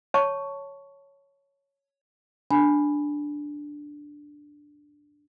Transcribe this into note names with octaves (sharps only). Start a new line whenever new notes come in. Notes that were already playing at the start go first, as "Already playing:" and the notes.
C#5 A5 C#6
D4 G#5 B5